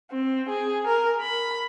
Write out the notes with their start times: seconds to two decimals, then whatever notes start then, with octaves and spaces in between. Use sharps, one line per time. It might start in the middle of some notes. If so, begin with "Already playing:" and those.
0.11 C4
0.49 G#4
0.87 A#4
1.21 B5